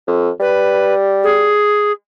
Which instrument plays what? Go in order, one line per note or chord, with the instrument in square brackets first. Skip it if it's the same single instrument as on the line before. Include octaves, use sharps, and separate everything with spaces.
[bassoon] F2
[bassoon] G3 [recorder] B4
[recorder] G#4